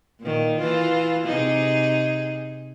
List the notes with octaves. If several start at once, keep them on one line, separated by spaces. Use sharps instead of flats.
A#2 D#3
E3 F4
C3 D#4 G#4